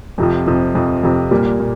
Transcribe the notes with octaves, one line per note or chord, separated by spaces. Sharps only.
F2 C3 F3
F2 C3 F3
F2 C3 F3
F2 C3 F3
A#2 G3 A#3
A#2